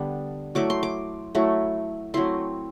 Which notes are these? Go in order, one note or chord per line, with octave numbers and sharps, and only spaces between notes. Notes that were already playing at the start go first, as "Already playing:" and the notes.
Already playing: D3 G3 B3 D4
F#3 A3 E4 D6
C6
D6
F#3 A3 E4
F#3 A3 C4 E4 C6